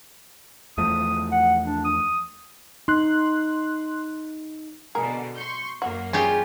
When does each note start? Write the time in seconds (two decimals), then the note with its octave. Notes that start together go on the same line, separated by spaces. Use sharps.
0.78 E2 F3 A3 D#6
1.32 F#5
1.65 D4
1.85 D#6
2.88 D#4 C6 F#6
4.95 B2 D3 G#4 A#4
5.35 C6 C#6 G6
5.82 F#2 A#3 F#4
6.13 C#3 G3 C#4 F4 G4 G#4